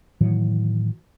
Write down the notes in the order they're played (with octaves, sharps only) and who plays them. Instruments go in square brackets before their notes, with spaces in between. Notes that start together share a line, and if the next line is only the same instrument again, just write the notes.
[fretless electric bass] A2 D#3 E3 F#3